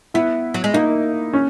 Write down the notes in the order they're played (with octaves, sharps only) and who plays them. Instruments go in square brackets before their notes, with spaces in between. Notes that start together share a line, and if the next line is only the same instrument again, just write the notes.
[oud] B3 [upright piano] E4
[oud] F#3
G#3
[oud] A#3 [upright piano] D#4
[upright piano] C#4